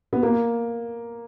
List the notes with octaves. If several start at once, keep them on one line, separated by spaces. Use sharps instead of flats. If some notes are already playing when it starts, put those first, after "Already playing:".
B3
A#3